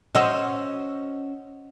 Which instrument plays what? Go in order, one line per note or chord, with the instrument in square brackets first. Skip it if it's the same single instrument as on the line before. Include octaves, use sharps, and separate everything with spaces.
[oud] C#4 F#4 C5 [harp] D#5 E6